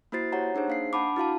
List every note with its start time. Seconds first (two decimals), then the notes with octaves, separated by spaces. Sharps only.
0.12 A#3 E4 F#4 C5 A6 C7
0.32 G4 C#5 F#5 A#5
0.55 D4 D#4 G#4 C5
0.68 A#3 F5 C7
0.93 D4 F#5 A5 B5 D6
1.16 E4 F#4 F5 A5